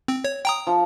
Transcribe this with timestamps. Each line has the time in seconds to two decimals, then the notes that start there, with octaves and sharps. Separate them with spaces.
0.08 C4
0.24 C#5
0.45 G5 A#5 D#6
0.67 F3